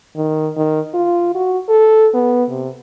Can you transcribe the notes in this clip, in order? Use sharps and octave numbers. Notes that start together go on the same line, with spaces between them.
D#3
D#3
F4
F#4
A4
B3
C3